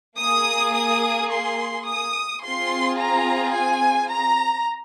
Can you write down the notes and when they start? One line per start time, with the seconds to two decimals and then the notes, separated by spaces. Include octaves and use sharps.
0.19 A#3 G#4 D#6
0.75 D#6
1.31 C6
1.87 D#6
2.43 C4 F4 G#4 C6
2.98 A#5
3.55 G#5
4.10 A#5